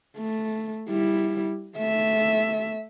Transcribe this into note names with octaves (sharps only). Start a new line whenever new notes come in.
A3
G3 E4
A3 E5